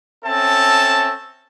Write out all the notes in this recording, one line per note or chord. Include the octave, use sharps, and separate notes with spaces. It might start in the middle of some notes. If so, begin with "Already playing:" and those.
C4 C#4 A4 E5 A5